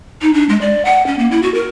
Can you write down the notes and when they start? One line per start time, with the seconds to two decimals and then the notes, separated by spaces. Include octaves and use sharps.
0.22 D#4
0.34 D4
0.49 G#3
0.61 D5
0.85 F#5
1.07 C#4
1.19 A#3
1.31 E4
1.42 F#4
1.54 A#4